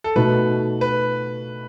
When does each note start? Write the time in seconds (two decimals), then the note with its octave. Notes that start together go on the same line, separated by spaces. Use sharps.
0.04 A4
0.16 B2 A3 D#4 F#4 B4
0.81 B4